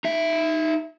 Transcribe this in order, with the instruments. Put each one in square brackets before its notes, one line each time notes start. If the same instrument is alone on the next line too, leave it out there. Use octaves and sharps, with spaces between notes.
[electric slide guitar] D#4 E5